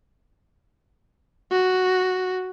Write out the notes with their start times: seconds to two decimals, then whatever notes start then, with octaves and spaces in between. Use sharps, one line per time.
1.52 F#4